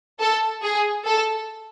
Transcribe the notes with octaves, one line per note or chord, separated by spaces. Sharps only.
A4
G#4
A4